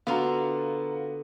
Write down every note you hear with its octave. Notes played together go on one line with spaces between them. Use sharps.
D3 B3 F4 F#4 F5 A#5